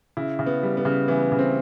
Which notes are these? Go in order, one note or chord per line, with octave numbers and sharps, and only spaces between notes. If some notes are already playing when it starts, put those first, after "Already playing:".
C#3 E4
C#3
B3
G3
B3
C#3
E3 B3
C#3
C4